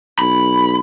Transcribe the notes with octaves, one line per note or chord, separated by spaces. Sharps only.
B1 B5